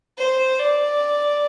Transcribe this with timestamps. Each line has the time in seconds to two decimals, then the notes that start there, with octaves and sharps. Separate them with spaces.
0.18 C5
0.59 D5